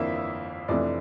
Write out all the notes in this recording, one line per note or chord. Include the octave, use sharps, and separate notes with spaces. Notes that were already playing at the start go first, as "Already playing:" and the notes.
Already playing: G1 F2 E3 A#3 D4 E4 E5
F1 F2 E3 A3 D4 D5